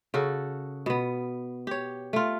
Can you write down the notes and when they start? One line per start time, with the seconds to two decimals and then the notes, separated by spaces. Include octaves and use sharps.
0.14 C#3 F#4 A4
0.86 B2 B3
1.67 G4 C#5
2.13 A3 F4